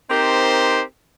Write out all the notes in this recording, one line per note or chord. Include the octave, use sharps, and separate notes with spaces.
C4 D#4 G4 A#4 C5